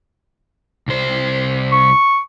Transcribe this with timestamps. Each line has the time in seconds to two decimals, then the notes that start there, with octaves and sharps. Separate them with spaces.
0.88 C2 C5
1.72 C#6